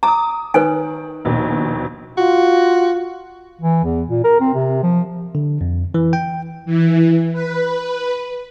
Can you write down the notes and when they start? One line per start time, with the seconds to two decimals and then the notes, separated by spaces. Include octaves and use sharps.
0.03 A#5 D6 D#6
0.54 D#3 B4 C#5 G#5
1.25 A#1 D#2 B2
2.17 F4 F#4
3.62 E3
3.84 E2
4.08 A#2
4.24 A#4
4.41 C4
4.54 C3
4.83 F3
5.35 D3
5.61 F2
5.94 E3
6.13 G5
6.65 E3
7.33 B4